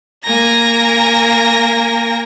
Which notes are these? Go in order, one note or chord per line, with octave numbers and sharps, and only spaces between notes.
A#3 G#5 A#5 A#6